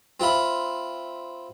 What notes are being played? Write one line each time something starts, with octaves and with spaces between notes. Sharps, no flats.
C4 F4 E5 B5